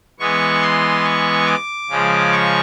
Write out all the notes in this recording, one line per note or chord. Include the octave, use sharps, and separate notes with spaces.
E3 G#3 B3 C#6
C6
C#6
D6
C#3 F3 G#3
C#6